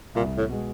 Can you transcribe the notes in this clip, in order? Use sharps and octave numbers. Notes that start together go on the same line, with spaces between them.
C2 A#2
A2
B2 G#3